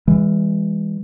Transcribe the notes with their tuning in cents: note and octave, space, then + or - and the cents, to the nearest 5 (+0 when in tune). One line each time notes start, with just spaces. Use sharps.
E3 +0 G#3 -35